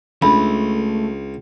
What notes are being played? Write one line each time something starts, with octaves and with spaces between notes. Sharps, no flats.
C#2 A3 D4 B5